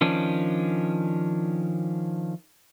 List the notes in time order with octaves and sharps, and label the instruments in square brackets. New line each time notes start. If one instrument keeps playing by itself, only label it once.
[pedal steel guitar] D#3 F3 C#4 D4